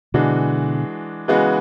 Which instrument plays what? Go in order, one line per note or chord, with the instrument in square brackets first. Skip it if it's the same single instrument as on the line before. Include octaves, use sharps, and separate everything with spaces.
[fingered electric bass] B2 D3 [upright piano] E3 G#3 D4 F#4
[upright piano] C#3 E3 G#3 B3 F#4